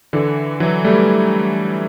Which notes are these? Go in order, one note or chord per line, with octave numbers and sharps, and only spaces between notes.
D3 E3
E3 F#3
G3 A3